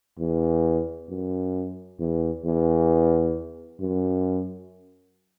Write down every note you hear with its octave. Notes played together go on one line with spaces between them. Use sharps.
E2
F#2
E2
E2
F#2